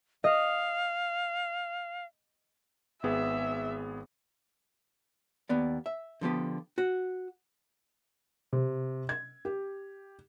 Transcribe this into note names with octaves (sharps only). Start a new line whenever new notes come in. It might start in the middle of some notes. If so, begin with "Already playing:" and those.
D#5 F5
G#1 B3 G#4 E5
D#2 B3 D5
E5
D3 F3 B3 G4
F#4
C3
G#6
G4